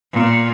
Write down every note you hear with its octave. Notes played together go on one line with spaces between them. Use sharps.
A#2